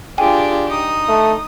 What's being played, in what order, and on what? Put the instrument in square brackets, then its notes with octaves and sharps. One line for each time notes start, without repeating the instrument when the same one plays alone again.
[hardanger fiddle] D4 G4 [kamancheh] F4 G#4 [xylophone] G5 G#5
[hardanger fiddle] D#4 [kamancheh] D#6
[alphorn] A3